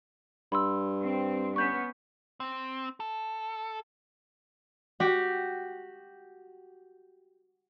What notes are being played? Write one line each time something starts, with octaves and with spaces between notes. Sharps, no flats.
G2 B5 C6 E6
C4
B3 C#4 C#6 G6 B6
C4
A4
F#4 G4